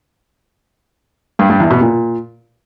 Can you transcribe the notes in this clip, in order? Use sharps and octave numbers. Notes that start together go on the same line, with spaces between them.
G2
G2
E2
B2
A#2